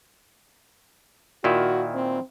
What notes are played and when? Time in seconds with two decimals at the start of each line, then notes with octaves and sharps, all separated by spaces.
1.44 A#2 D#3 E4 F#4
1.94 C4